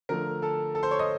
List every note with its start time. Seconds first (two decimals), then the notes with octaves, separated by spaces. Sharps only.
0.09 D3 F3 A3 A#4 A#5
0.42 A4 A5
0.75 A4 A5
0.83 C5 C6
0.91 C#5 C#6
0.99 D#5 D#6